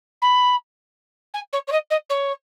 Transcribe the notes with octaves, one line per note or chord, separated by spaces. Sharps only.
B5
G#5
C#5
C#5
D#5
D#5
C#5